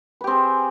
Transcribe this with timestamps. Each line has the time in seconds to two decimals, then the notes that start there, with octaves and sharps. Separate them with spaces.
0.21 B4
0.24 G4
0.27 C4
0.31 G#4